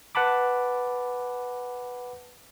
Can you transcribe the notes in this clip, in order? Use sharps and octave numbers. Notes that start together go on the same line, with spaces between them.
B4 F#5 A5 B5 D6